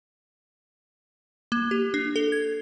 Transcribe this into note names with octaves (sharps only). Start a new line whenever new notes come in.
A#3
G4
D4
A4
G#6